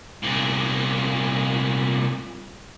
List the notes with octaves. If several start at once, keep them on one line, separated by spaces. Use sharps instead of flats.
C2 A#2